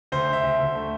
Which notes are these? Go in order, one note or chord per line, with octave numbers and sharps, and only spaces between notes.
D2 C5
D2
E5
D2
D2
A3